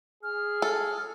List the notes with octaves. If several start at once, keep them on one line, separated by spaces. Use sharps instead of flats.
G#4 F6
A4